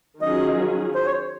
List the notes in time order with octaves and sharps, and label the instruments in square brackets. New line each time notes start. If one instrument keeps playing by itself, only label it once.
[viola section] D#3 F#3 C#4 F4 G#4 [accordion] D#5
[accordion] C5
C#5